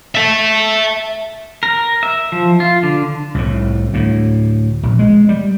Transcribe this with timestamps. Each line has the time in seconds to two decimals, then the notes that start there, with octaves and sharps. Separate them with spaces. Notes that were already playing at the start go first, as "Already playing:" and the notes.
0.15 E5 A5
1.63 A#4
2.03 E5
2.32 F3
2.60 F4
2.83 D3
3.35 C2 A2
3.93 D2 A2
4.83 A#1
4.99 G#3
5.29 G3